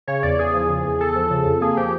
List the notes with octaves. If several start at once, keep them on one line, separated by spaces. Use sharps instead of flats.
C#3 C#5
E2 D5
E2 G#4
F3
C#3
E2
E2 A4
F3
C#3
F2
A#3 G#4
F3 G4